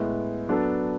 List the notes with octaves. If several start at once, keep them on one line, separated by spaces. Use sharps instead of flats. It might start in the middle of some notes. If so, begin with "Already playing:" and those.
Already playing: A2 G#3 B3
F#3 B3 D4 A4